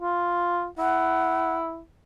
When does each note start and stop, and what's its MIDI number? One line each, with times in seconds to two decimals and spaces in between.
0.01 0.66 65
0.78 1.81 64
0.78 1.55 78